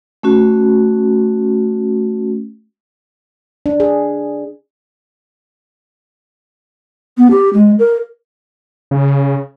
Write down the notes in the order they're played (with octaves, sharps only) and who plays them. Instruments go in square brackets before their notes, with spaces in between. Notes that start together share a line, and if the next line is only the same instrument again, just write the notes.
[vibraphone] A3 C#4 F#4
[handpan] D4
G#4
[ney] B3
G4
G#3
A#4
[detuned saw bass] C#3